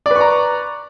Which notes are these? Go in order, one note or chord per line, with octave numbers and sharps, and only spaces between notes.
B4 D5 A#5 C#6